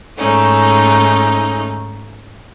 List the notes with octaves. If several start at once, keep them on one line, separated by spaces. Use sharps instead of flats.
G#2 A3 C#4 D#4